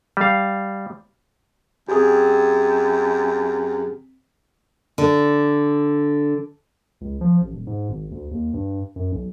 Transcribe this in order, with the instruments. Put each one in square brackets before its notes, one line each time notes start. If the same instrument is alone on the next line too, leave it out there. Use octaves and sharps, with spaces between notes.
[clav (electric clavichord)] G3 F5
[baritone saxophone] F#2 [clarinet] C4 [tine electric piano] G4 G#4
[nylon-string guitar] D3
[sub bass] C#2
F3
A1
D#1
G#2
G#1
D2
D#2
G2
F#2
B1